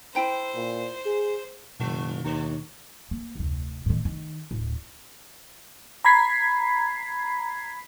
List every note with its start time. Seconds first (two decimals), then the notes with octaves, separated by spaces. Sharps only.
0.15 E4 C5 G5 A#5
0.55 A#2
1.06 G#4
1.79 F#1 D#2 B2 D#3 G#3
2.24 D#2 D3 C#5
3.11 A#3
3.35 F1 D2
3.86 A2 D#3
4.05 D#3
4.51 D1
6.05 A#5 B5 G#6 B6 C7